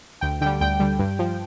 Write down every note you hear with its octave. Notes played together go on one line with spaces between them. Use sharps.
D2 G5
D3 G3 G5
D2 G5
D3 G3
G2
F3